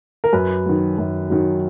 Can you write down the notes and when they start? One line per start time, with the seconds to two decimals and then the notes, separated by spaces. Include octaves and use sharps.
0.24 A#4
0.33 F#2 B4
0.66 D#3 F#3
0.98 F#2
1.30 D#3 F#3